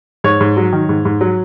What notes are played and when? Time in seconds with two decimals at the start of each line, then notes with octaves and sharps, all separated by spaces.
0.24 G#2 C#5
0.40 G#2
0.57 F#3
0.73 D#3
0.89 G#2
1.05 G#2
1.21 F#3